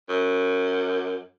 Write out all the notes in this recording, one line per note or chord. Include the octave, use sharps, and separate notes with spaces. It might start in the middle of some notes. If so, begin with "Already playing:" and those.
F#2